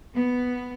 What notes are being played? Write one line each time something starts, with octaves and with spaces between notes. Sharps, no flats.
B3